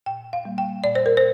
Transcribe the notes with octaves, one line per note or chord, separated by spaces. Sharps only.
A#2 G5
F5
G3 A#3
G5
A#2 D5
C5
A#4
C5